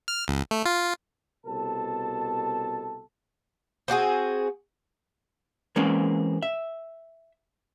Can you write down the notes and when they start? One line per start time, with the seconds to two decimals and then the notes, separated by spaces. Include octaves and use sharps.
0.08 F6
0.28 C#2
0.51 A3
0.65 F4
1.46 C2 B2 A4 A5
3.88 C4 D4 F#4 G#4
5.76 E3 G#3 A#3 C4 C#4
6.42 E5